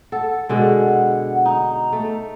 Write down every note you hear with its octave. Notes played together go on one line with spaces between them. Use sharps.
A4 F#5
B2 D3 G#3
D#4 A#5
A3